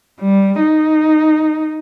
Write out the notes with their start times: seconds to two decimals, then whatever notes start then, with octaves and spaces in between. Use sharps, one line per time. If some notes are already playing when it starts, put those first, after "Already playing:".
0.20 G3
0.61 D#4